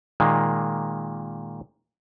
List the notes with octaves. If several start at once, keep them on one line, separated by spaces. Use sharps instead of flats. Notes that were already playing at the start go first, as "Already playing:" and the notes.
A#2 D#3 G#3 A#3